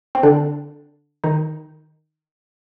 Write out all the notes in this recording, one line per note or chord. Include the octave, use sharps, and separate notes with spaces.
C4
D3 D4
D#3 D#4